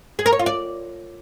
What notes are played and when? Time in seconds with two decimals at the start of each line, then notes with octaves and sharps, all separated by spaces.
0.19 G#4
0.26 A#4
0.33 C#5
0.39 F4
0.46 D5